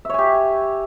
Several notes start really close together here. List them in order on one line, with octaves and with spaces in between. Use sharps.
E5 C#5 G#5 G4